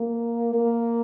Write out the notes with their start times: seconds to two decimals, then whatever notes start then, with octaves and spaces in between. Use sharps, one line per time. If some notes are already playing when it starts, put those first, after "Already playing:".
Already playing: A#3
0.53 A#3